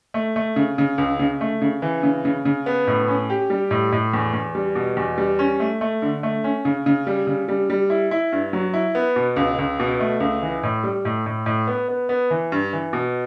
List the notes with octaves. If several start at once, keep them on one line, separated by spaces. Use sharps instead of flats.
A3
A3
C#3
C#3
C#2
C#3
A3
C#3
E3
C#3
C#3
C#3
B3
A2
C#4
G4
G3
A2
A2
E2
E2
G3
B2
E2
G3
C#4
A3
A3
D3
A3
C#4
C#3
C#3
G3
C#3
G3
G3
E4
E4
G2
F#3
E4
B3
B2
C#2
C#2
B2
A3
C#2
E3
A2
G3
A2
A2
A2
B3
B3
B3
E3
G2
E3
B2